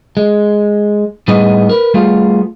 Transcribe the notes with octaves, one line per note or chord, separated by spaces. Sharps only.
G#3
A2 G3 B3 D#4 G#4 D#5
A#4 B4
G3 A3 B3 F4 G#4 F5